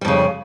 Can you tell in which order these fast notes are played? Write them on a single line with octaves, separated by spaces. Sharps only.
G3 F2 C#3